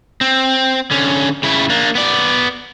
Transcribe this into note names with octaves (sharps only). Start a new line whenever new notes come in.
C4
D3 C#4
C#3 E4
A#3 D4
B3 D5